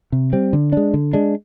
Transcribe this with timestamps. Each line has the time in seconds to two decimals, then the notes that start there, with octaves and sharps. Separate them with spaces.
0.12 C3
0.33 G3 C4
0.53 D3
0.73 G#3 D4
0.94 D3
1.13 G#3 D4